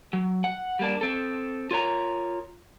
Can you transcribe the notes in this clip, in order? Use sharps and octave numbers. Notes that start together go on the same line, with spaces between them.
F#3
F#5
G3 A#3 D4
C4 A4
F4 A#4 C#5 A#5